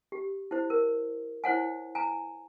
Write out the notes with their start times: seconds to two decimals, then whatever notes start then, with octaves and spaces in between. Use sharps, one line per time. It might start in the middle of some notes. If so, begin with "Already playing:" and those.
0.12 G4
0.51 E4 C5
0.70 A#4
1.44 E4 C5 C#5 F#5 G#5
1.95 G#5 A#5